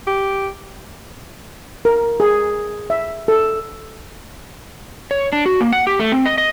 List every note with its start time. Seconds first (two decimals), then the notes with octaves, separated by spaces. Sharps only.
0.07 G4
1.85 A#4
2.20 G#4
2.90 E5
3.28 A4
5.11 C#5
5.33 D4
5.46 F#4
5.60 A#3
5.72 F#5
5.87 G4
6.00 A3
6.12 C4
6.26 D#5
6.38 D#5